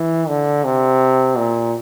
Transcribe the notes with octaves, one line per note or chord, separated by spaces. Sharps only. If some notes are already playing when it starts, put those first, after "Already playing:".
Already playing: E3
D3
C3
A#2